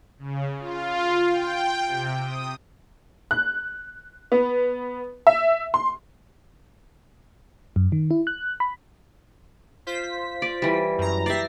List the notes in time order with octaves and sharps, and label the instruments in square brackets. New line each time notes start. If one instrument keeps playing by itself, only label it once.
[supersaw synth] C#3
F4
G5
C3
D#6
[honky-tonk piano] F#6
B3
E5
C6
[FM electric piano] F#2
D#3
E4
F#6
B5
[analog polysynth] F4 C5 B6
[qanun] D5
E3 G3
[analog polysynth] F#2 A#5
[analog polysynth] G4 A#6 C7 [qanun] D5 E5